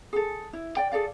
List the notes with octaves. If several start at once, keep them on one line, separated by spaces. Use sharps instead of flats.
G#4 A4
E4
D5 G5
G#4 A4 D5 F5